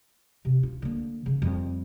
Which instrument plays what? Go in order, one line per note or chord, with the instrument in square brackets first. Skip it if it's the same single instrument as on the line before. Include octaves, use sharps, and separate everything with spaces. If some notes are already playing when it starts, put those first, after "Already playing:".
[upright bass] C3
F4
D3 A#3
C#3
F2 G3